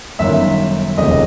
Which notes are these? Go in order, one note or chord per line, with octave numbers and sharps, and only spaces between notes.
G1 F#2 D#3 E5
F1 D#2 C#3 D#5